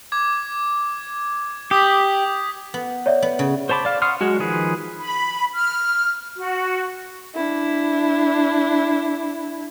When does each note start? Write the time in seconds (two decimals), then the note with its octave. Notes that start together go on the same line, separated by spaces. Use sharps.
0.12 D6 G#6
1.71 G4 D#6 G6 B6
2.74 B3
3.06 C#5 D5 E5
3.22 B3
3.39 C#3
3.69 C5 C#5 A5 B5 D6
3.85 D5 F5
4.02 F#5 C6 C#6 D#6 F6
4.21 F#3 G#3 F#4
4.39 D#3 F3 G#4 B4
4.99 B5
5.54 F6
6.36 F#4
7.35 D4 E4